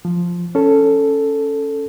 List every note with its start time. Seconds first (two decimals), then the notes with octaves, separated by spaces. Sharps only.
0.05 F3
0.55 C#4 A4